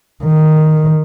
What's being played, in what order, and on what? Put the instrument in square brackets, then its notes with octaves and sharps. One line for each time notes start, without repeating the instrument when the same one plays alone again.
[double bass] D#3